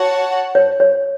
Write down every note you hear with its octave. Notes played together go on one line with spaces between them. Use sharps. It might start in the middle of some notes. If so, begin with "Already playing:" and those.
Already playing: F#4 C#5 F#5 A5
C#5
C#5